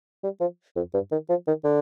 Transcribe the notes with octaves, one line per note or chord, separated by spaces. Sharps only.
G3
F3
F2
G2
D#3
F3
D#3
D3